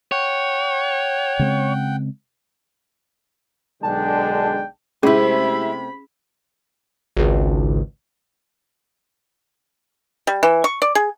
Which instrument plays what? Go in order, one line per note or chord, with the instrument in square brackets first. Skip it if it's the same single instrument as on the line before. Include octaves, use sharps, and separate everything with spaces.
[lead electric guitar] C#5 [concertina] F#5 G5
[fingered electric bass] C#3 G#3 C4
[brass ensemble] B1 D3 G#3 [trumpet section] D4 G5 [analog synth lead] A5
[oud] C3 A3 [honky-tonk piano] G#3 E4 [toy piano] C#4 G#4 [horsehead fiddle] B5
[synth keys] G#1 C#2
[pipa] G3
E3
C#6
D5
G#4